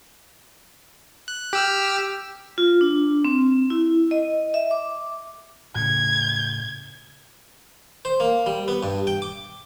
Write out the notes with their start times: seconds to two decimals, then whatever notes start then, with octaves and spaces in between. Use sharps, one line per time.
1.28 F#6
1.53 G4 E6 F6
2.58 F4
2.81 D4
3.25 C4
3.70 E4
4.11 D#5
4.54 E5
4.71 D6
5.75 A2 C#3 G#6
8.05 C5
8.20 A#3
8.46 G3
8.68 B3
8.83 G2
9.07 G5
9.22 D6